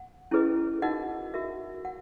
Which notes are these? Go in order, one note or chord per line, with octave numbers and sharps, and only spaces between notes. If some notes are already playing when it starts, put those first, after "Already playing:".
Already playing: F#5
C#4 E4 G#4 B4 D#5
D#4 F#4 A#4 D#5 F#5
F#4 A#4 E5
F#5